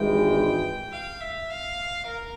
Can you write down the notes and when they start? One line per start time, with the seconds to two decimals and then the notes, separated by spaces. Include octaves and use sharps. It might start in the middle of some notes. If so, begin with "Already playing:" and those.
Already playing: G#1 G2 E3 G#3 G5
0.92 F5
1.21 E5
1.50 F5
2.06 A#4